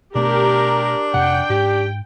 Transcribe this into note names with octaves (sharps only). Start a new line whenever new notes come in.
B2 A3 D4 G4 A#4
F2 C3 F#5 G5
G#2 G4